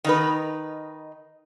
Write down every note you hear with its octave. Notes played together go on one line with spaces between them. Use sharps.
D#3 D#4 B4